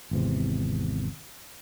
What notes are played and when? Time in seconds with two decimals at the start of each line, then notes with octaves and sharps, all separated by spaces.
0.11 G#1 E2 C3